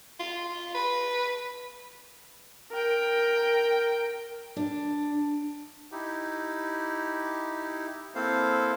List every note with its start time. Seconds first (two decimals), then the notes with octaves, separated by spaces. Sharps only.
0.19 F4
0.49 F4
0.75 B4
2.71 A#4 G5
4.56 D4
5.92 D#4 E4 G4
8.15 A#3 C4 E4 A4 C5 F5